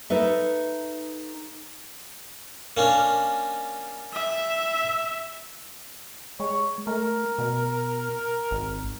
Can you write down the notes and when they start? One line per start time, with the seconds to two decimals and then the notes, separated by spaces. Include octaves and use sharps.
0.10 D#4 A4 B4 E5
2.77 A#3 C#4 D4
4.13 E5
6.40 G#3 C#5
6.87 A3 A#4
7.38 B2
8.51 G#1